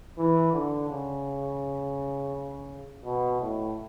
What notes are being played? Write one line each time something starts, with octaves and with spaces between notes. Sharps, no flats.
E3
D3
C#3
B2
A2